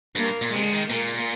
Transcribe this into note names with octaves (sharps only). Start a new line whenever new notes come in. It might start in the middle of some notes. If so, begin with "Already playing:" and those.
G2 A#3
A#2
C3 G#3
D3
D#3
A#2 A#3